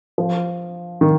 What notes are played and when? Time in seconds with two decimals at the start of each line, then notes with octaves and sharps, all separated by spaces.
0.18 F3
1.01 D#3